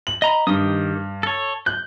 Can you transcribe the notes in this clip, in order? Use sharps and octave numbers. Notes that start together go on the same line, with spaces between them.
F#7
D#5 A#5 B5
G2 D#3 G4 D#6
A4 C#5
F#6 G6